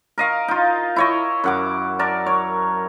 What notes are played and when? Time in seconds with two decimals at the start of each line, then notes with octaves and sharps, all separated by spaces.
0.18 A#4 D#5 F5
0.48 D#4 F4
0.96 E4 C#5 D#5
1.44 F#2 F#5 D6
1.99 A#4 D5 A5
2.26 C#5